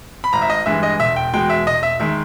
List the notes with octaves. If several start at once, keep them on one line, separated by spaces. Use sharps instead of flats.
B5
G#1 A#5
E5
D#5
G2 E3 G#3 E5
D#5
E1 E5
G5
E2 B2 G#3 G5
E5
E1 D#5
E5
D#3 G#3 E5